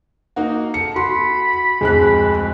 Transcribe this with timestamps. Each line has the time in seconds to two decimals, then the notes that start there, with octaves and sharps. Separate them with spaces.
0.36 A#3 D#4 F#4
0.74 A4 C#7
0.96 F#4 B5 C6
1.81 D1 F2 G#3 F#6